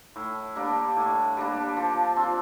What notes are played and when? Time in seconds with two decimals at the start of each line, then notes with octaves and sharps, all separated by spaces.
0.16 A2
0.56 G3 A#3 D4
0.96 A2
1.37 G3 A#3 D4
1.77 F3
2.16 C4 F4